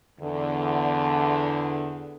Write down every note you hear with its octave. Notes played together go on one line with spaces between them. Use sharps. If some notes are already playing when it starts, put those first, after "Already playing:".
E2 D3